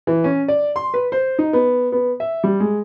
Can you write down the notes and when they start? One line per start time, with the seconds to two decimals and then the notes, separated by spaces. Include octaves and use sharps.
0.07 E3
0.24 C#4
0.48 D5
0.76 C6
0.94 B4
1.12 C5
1.39 D#4
1.53 B3
1.92 B3
2.20 E5
2.44 G3
2.60 G#3